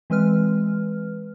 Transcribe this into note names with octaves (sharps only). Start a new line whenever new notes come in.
E3 G#3 C4 B4 F6